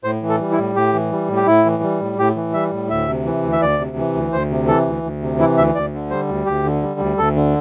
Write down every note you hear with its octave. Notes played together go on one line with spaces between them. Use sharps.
A2 C5
E3
A4
G3
E4
A2
A2 G4
E3
G3
A2
G4
A2 E4
E3
G3
A2
A2 G4
E3
G3 E5
A2
D2 E5
C3
E3
D2
E5
D2 D5
C3
E3
D2
D2 C5
C3
E3 A4
D2
D2
C3
E3 E4
D2 E5
D2 D5
D3
G3 C5
D2
D2 G4
D3
G3
D2
D2 A4
D3